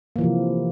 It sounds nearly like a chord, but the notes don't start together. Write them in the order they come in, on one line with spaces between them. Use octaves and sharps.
A#3 E3 F3 C3